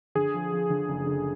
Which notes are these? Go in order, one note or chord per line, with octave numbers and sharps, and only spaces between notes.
D3 G#4
F3
F3
D3
F#1
D3